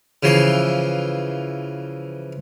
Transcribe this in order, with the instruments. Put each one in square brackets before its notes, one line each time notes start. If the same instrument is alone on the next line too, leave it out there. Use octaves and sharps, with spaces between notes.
[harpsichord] C#3 E3 F3 C6